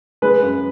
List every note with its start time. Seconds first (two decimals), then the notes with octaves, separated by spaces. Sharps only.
0.22 G#3 B4
0.42 F#2